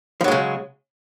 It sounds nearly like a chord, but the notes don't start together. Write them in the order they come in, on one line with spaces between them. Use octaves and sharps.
F3 F#3 G#3 C#3